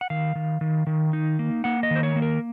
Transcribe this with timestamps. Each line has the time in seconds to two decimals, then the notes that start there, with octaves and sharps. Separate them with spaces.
0.01 F#5
0.10 D#3 F5
0.35 D#3
0.61 D#3
0.87 D#3
1.13 D#4
1.39 A#3
1.64 A#3 F#5
1.83 D#5
1.91 D#3 C5
2.03 C#5
2.16 A#3
2.22 A#4